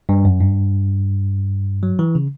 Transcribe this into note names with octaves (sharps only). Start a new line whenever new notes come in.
G2
F#2
G2
F#3
E3
C#3